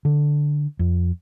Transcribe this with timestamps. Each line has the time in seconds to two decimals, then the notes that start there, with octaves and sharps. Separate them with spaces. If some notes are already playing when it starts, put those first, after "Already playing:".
0.05 D3
0.79 F2